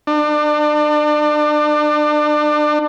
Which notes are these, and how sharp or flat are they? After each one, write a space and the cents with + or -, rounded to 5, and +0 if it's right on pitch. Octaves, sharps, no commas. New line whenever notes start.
D4 +35